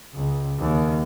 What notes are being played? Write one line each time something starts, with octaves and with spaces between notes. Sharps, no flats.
C#2
D#2